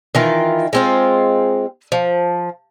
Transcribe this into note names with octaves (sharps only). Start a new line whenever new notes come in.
D#3 E3 F4
G#3 C4 F4
F3